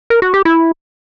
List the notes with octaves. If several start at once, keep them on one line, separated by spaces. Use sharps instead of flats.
A#4
F#4
G4
E4